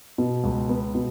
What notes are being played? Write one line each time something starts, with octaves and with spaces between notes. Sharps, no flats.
B2
C#2
B3
B2